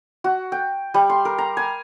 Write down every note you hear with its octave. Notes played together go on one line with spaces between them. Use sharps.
F#4
G5
G3
C6
A#4
A#5
G#5